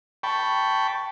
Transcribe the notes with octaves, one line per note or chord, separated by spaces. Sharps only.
G5 A5 B5 C#6